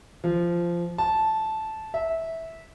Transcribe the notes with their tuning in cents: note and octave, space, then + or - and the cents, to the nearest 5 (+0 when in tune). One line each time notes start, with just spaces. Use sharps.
F3 -15
A5 -10
E5 -15